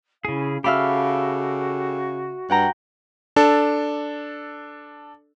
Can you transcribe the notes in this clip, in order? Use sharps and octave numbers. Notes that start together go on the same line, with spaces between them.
C#3 C#4 E4 G#4 F5
C#3 F#4 G4 A4 E5 F5 B5 F6
G2 F#5 G5 A#5
D4 A4